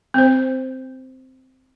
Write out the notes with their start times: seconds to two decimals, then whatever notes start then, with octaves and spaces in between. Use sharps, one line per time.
0.14 C4 C5